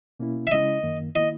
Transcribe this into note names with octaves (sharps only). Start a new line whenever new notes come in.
B2 A#3 C#4 E4
E5
C#3 G#3 C#4 E4 D#5
F#2 D#3 A#3
D#3 A#3 E4 D#5